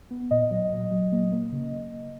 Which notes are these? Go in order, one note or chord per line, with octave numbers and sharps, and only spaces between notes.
B3
A#2 D#5
F#3
A#2
F#3
A#3
A#3
C#3